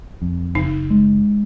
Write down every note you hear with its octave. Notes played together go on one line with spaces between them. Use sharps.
F2
F#1 D#4
G#3